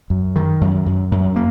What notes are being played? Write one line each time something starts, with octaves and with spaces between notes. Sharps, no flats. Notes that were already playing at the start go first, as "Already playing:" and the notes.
F#2
D#3
F#2
F#2
F#2
A#3